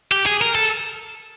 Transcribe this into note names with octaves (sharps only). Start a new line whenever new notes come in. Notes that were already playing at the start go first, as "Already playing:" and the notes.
G4
G#4
A#4
A4